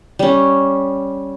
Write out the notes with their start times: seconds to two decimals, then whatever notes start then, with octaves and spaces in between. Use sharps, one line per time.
0.19 G3 C#4